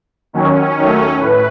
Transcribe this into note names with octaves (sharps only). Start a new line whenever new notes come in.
D#2 D#3 F#3 C#4
D#2 D#3 F#3 A3
A2 B4